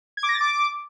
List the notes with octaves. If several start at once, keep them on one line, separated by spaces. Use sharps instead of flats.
G#6
D6
A#6
A6
D6